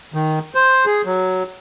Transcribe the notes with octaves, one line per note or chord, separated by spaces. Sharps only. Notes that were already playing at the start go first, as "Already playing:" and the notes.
D#3
C5
G#4
F#3